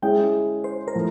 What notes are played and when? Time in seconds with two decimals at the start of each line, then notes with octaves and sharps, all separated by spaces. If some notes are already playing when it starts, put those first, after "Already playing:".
0.02 G#3 C#4 E4 G#4 G5
0.64 C5
0.88 A#4
0.95 A2 F3